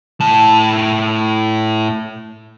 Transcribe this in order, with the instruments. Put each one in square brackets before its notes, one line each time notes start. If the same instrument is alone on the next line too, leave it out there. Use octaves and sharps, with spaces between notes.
[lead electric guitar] A2 A5